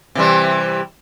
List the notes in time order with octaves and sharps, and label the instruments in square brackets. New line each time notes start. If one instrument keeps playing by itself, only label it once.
[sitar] C3 E3 G3